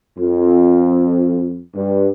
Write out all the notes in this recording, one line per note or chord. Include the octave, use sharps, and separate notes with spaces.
F2
G2